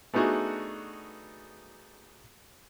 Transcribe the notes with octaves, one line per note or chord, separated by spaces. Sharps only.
A3 B3 D4 D#4 F#4 G#4